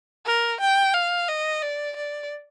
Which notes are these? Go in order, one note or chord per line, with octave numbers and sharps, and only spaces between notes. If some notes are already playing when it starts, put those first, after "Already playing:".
A#4
G5
F5
D#5
D5
D5